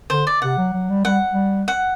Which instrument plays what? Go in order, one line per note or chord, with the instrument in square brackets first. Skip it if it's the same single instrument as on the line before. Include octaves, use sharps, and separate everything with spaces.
[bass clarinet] D3 [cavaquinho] C5
[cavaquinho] D5
[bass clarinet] C3 [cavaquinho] F#5
[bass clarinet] F#3
F#3
G3
[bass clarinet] G3 [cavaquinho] F#5
[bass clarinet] G3
[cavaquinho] F#5